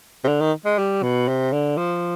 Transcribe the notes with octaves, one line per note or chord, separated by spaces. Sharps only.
C3
D3
D#3
G#3
G3
B2
C3
D3
F3